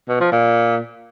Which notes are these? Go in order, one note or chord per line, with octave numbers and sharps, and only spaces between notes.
B2
F3
A#2